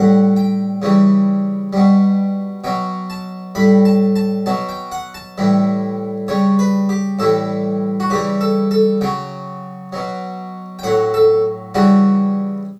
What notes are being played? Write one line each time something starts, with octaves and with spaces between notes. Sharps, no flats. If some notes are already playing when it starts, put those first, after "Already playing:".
Already playing: A2 G3 F#5
G5
C#3 E3 G3
B2 G3
B2 F#3 G5
A5
A2 G3 B5
A5
A5
B2 F#3 A5
G5
F#5
A5
A2 E3 G3
C#3 G3 C#5
B4
G4
A2 E3 G3 A4
F#4
C#3 E3 G3 G4
A4
A4
C#3 F#3 G5
B2 F#3
G5
A2 F#3 F#5
A4
C#3 E3 G3 F#4